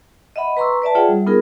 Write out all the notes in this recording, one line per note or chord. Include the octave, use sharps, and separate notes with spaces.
D#5 E5 F#5 B5
B4 A#5 C6 C#6 E6
B4 D5 E5 A5
F4 G#4 C#5 E5 F#5 G5
G3
B3 D#4 F4 G#4 A#4